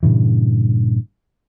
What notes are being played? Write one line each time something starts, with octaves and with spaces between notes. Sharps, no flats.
G2 A#2 C#3 E3